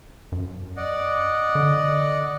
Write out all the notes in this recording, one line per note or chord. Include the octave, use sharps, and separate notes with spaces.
F#2
D5 D#5 F#5
D3